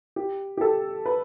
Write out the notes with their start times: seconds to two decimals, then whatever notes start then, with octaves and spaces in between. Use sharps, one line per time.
0.16 G4
0.57 G4
0.61 A4
1.06 B4